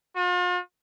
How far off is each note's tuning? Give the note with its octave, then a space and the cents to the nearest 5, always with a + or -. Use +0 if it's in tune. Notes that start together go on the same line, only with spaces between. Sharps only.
F4 +40